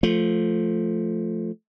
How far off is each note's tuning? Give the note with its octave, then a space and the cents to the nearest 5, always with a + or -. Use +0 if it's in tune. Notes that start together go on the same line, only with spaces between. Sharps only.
F3 +0 A3 +0